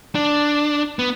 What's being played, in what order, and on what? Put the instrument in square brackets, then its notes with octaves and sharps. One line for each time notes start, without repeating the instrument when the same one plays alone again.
[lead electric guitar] D4
B3